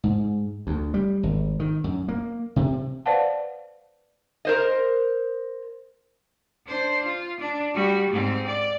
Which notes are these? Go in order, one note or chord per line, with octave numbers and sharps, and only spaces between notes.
G#2
D2
G3
G#1
D#3
F#2
A#3
C3
B4 C5 D5 F5 F#5 A5
A#4 C5 D#5
D4 C5
F4
D4
G3 F#4
G#2 C4
D5